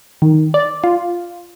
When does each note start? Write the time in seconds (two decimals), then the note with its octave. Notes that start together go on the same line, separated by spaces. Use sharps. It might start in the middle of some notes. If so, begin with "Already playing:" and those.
0.22 D#3
0.54 D5
0.84 F4